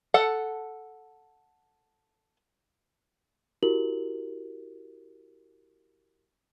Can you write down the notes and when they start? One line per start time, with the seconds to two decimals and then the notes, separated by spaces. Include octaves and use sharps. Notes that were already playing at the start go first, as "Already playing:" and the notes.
0.14 A4 F#5
3.63 E4 F#4 G4 A#4 F#7